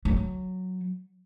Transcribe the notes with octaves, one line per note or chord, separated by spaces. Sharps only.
F#3